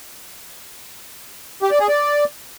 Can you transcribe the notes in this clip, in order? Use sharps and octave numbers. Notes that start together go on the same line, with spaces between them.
G4
D5
G#4
D5